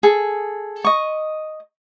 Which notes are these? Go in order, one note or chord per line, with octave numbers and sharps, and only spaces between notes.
G#4 A4
D#5 C#6